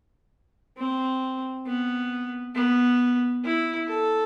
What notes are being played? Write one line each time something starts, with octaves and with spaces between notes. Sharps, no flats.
C4
B3
B3
E4
A4